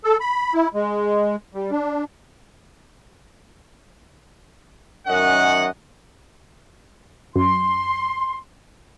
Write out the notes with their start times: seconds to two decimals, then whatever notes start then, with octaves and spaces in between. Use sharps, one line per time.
0.04 A4
0.21 B5
0.54 E4
0.74 G#3
1.55 G3
1.71 D4
5.07 F#2 D#3 C#4 D#5 F#5
7.36 F#2 C6